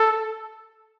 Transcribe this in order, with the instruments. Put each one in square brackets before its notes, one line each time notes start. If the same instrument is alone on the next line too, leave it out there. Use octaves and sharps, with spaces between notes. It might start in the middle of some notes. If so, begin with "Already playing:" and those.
Already playing: [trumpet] A4